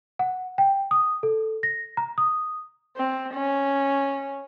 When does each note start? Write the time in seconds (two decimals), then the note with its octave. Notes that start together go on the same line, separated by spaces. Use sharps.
0.19 F#5
0.58 G5
0.91 D#6
1.23 A4
1.63 A#6
1.97 A#5
2.18 D#6
2.97 C4
3.34 C#4